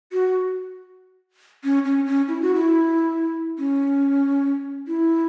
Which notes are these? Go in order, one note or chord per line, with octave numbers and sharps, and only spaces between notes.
F#4
C#4
C#4
C#4
E4
F#4
E4
C#4
E4